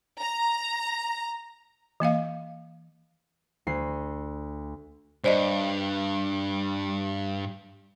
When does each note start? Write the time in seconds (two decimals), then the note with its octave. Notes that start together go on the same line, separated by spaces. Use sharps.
0.20 A#5
2.00 E3 A#3 D#5 F5
3.67 D2 C7
5.24 G2 C5 D5 D#5